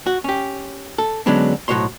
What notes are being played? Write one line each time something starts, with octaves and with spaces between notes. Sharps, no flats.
F#4
C#4 G4
A4
D3 F#3 G#3 B3 C#4 D4
B1 A2 F#4 C5 C#5 C6